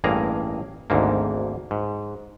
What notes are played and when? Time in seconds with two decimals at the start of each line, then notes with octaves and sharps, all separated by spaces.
0.04 A1 G2 A#3 G#4 A#5
0.90 G#1 D2 G#2 A#3
1.71 G#2